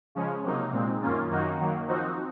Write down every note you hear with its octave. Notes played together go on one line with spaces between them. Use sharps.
C#3 F3 G#3 C#4
C3 F#3 A#3 D#4
A#2 G#3 C4
F#2 D#3 A#3 C#4 F4
F#2 D#3 A#3 D#4 F#4
D#3 F#3 A#3
F3 C4 D#4 F#4